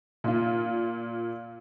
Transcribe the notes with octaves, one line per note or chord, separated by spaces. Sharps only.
A#2 F4